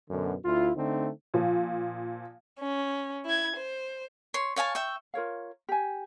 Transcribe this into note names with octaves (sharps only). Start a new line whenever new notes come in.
F#2 B2 D3
D2 E4 F4
D3 A3 C4 D#4
A#2 F3
C#4
E4 G#6
C5
C#5 C6
C#5 F5 G#5 A5
E5 G5 C#6
F4 A#4 C#5 F5
G4 G#5